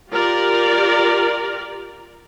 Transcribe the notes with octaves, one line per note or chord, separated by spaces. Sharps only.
F4 G4 A#4 D5